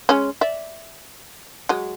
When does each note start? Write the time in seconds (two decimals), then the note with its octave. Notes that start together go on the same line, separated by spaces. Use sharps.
0.09 G#3 C#4
0.41 D5 E5
1.69 F#3 G#3